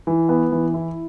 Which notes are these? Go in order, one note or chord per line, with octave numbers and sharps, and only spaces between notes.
E3
B3
E3
E4